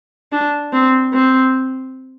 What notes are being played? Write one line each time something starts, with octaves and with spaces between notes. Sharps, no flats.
D4
C4
C4